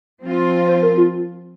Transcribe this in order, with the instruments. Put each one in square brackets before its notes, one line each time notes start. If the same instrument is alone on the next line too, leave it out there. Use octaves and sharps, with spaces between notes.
[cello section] F3 C4 F4
[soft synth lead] C5
A#4
F4